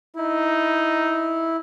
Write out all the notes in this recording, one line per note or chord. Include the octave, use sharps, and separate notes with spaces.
D#4 E4